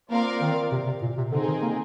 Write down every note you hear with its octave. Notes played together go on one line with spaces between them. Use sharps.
A#3 C4 F4 A#4 D5 F5
D#3
C3
C3
A#2
C3
D3 C4 D#4 G#4
D#3
A#3